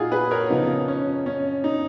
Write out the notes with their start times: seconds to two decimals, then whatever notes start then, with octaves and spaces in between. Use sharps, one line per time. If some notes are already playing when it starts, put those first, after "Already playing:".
Already playing: A#2 D#4 F4 F#4 G#4
0.12 G#4 B4
0.31 A#4 C#5
0.50 C#3 F3 B3 D#4
0.88 C#4
1.26 C#4
1.64 D#4